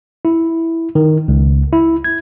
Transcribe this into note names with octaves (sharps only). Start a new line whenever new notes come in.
E4
D#3
C#2
E4
G#6